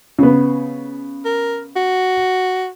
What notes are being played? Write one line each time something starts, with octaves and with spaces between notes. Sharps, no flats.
C#3 B3
A#4
F#4